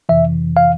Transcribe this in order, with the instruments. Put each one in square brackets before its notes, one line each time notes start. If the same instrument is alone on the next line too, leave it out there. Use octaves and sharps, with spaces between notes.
[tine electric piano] F2 C3 E3 E5
F5